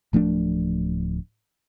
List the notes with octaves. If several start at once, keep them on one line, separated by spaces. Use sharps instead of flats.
D1 F3 A3 D4